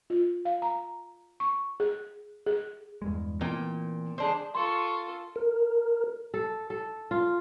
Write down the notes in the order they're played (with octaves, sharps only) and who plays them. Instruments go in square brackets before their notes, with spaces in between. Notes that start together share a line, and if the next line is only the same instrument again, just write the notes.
[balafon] F4
F5
A#5
C#6
G#4
G#4
[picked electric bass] E2 G2 G#3
[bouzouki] A#2 G5 [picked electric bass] E3 B3 C4
[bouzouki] G#3 D4 C5
[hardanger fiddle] F4 A4 [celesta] C6 [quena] C#6
[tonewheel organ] A#4
[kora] A4
A4
F4